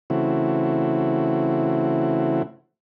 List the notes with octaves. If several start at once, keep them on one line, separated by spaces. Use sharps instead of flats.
C#3 E3 A3 C4 E4 F#4